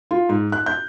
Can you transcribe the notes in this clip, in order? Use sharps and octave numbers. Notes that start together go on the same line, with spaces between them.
F4
G#2
F#6
G6